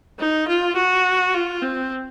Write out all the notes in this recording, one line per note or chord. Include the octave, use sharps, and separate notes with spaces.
D#4
F4
F#4
F4
C4